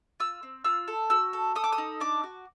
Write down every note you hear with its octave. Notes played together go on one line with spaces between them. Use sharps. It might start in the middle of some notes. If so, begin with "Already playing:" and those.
F4 E6
C4
F4 E6
A4
F#4 E6
A4
A4 D#6
D6
D#6
D#4
D4 D6
F#4